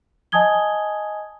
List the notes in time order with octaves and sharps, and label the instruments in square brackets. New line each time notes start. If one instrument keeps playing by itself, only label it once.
[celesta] D#5 G#5 A5 D#6 G#6 G7